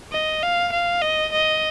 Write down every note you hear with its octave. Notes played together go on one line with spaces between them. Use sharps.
D#5
F5
F5
D#5
D#5